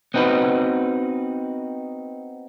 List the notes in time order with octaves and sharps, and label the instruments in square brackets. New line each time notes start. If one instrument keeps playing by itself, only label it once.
[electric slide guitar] B3 C4 D#4 F#4 B4